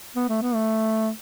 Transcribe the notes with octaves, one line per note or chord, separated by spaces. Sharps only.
B3
A3
B3
A3